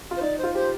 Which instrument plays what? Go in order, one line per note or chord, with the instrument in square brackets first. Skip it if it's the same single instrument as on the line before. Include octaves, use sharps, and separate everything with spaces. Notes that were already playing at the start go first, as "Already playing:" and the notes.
[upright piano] F4
[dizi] C5
[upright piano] D#4 [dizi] D5
[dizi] C5
[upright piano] F4
[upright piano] G4 [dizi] C5